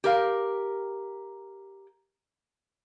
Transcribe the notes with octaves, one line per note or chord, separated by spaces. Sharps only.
G4 A#4 F5